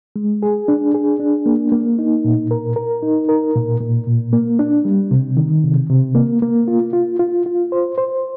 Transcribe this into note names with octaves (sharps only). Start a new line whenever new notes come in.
G#3
G#4
D4
G#4
D4
A#3
A#3
D#4
A#2
A#4
A#4
D#4
A#4
A#2
A#2
A#2
A#3
D4
G3
C3
D#3
C3
C3
A#3
A#3
F4
F4
F4
F4
C5
C5